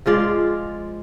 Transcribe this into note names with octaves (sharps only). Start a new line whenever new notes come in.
F3 G#3 F4 D5